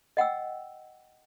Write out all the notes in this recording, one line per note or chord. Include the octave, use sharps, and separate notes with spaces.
D#5 F#5 G5 E6